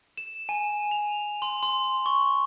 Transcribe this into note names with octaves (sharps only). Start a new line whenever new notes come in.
E7
G#5
F7
C6
C6
C#6